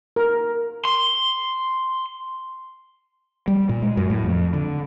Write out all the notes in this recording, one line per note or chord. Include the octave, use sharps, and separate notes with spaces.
A#4
C6
G3
A#2
G#3
F#2
A2
F2
D3